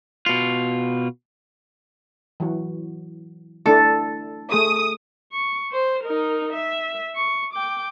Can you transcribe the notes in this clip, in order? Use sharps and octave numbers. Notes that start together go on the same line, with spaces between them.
B2 F4
E3 F#3 F#4
A3 D4 E4 A4
A3 G#4 D#6
C#6
C5
D#4 A#4
E5
C#6
G5 D6